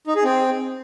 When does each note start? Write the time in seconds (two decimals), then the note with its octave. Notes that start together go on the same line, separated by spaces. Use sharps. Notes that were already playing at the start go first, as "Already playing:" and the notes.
0.07 D#4
0.15 G#4
0.24 C4